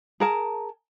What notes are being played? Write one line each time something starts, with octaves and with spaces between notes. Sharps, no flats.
G#4 A#4 A5